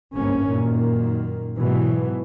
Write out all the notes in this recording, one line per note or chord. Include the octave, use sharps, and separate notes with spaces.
G1 C2 G#2 A#3 C4 C#4
F#2 A#2 D#3 A#3
G#2 B2 E3 F#3